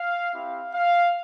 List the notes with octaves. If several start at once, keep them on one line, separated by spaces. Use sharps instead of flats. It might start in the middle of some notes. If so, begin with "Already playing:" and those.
Already playing: F5
C4 E4 G4 F5
F5